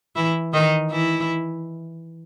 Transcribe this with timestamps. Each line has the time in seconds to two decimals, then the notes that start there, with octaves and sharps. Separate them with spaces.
0.16 E3 E4
0.53 D#3 D#4
0.90 E3 E4